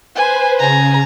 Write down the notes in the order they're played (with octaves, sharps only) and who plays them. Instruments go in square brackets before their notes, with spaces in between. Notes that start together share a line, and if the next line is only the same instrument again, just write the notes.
[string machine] B4 C5 [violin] G#5
[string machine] C#3 [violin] G#5 A#5